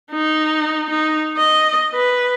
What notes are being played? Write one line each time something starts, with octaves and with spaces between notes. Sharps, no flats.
D#4
D#4
D#5
B4